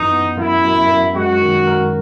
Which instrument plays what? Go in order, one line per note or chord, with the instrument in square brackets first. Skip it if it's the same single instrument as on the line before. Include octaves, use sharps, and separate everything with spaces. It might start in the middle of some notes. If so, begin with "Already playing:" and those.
Already playing: [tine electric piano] F#2 E3 [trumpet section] D#4
[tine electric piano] B3
[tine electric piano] F#2 [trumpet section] E4
[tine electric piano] F#2
F#2
[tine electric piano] G#3 [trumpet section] F#4
[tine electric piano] D#3
A#4